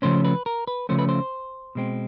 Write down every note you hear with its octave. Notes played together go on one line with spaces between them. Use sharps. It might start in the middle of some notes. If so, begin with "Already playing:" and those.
C#3 F3 A3 C#4 C5
B4
A#4
B4
C#3 F3 A3 C#4 C5
B4
C5
B2 G#3 C4